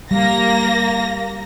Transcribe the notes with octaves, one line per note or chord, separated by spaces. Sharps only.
G3 A#3 A#6